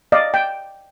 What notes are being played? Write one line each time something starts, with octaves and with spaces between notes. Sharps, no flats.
D5 D#5 F5
G5